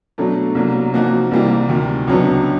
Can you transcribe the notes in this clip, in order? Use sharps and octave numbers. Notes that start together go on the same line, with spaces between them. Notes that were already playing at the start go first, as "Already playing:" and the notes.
B2 F#3 A3 D4
C2 B2 F#3 A#3
C3 F3 A#3 D#4 F#4
C2 C3 E3 G3 A#3
D2 C3 D#3
C#2 B2 F#3 B3 D4